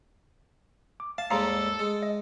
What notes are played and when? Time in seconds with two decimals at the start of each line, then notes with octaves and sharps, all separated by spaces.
1.00 D6
1.18 F5 A5
1.31 D#2 G#2 G3 A4 F5 A#5 C6
1.79 G#3
2.03 D#5